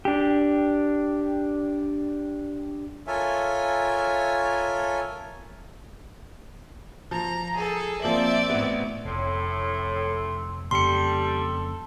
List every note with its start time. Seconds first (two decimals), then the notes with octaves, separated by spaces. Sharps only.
0.05 D4 G4
3.07 F4 A4 A#4 C#5 E5 G#5
7.11 F3 A#5
7.55 G#4 A4
8.02 F3 A#3 C4 D5 E5 F#7
8.50 A1 B3
9.05 F1 A2 C4
10.71 F2 C#3 G3 A#3 A4 C6 C#7